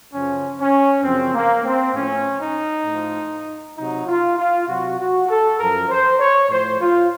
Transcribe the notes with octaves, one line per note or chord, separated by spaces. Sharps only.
F#2 C#3 F3 C#4
C#4
F#2 C#3 F3 C4
A#3
C4
A2 F3 C#4
D#4
A2 F3
C3 F#3 D#4
F4
F4
C3 F#3 F#4
F#4
A4
F#2 F3 A#4
C5
C#5
A2 F3 C5
F4